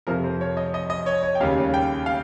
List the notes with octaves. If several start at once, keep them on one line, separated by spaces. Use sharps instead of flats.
F2 C3 F3 C4 A#4
C5
C#5
D#5
D#5
D#5
C#5
C#5
G5
D#2 C#3 G3 A#3 F5
G5
F5